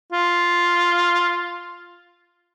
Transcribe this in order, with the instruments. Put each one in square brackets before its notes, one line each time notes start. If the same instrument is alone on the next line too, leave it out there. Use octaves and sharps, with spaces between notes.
[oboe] F4